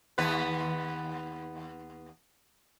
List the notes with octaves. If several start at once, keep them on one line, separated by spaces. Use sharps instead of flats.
D#2 B3 B4